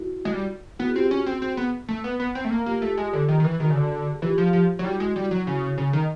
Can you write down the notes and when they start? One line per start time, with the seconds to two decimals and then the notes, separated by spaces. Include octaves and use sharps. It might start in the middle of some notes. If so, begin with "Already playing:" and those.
Already playing: E4 F#4
0.25 G#3
0.33 G3
0.79 B3 E4 F#4
0.88 G#4
0.95 C4 F4 G4
1.10 C#4 F#4 G#4
1.26 C4
1.42 C4
1.57 B3
1.89 A3
2.04 B3
2.20 B3
2.35 C4
2.45 A3
2.51 A#3
2.66 A#3 F4 G4
2.82 A3
2.97 G#3
3.13 D3
3.28 D#3
3.40 D#3
3.44 E3
3.60 D#3 F#4 G#4
3.70 C#3
3.75 D3
4.14 G#4
4.22 E3 F4 G4
4.38 F3
4.53 F3
4.79 F#3
4.84 G3 E4 F#4
5.00 G#3
5.16 G3
5.31 F#3
5.47 C#3
5.78 C#3
5.93 D#3